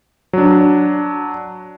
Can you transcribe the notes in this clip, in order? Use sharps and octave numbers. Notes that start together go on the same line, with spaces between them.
F#3 D4